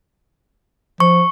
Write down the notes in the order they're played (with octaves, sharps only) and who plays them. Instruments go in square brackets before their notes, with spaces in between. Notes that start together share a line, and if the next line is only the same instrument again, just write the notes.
[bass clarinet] F3 [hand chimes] C#6